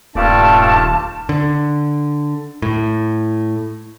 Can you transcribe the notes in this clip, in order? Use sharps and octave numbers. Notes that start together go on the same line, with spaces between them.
D#1 G2 A3 F4 D5 A5
D3
A2